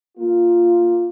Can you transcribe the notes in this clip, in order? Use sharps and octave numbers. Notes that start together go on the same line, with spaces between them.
A#3 F4